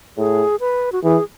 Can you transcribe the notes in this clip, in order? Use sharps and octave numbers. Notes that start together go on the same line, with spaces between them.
A2 G#4
B4
F#4
E3 G#4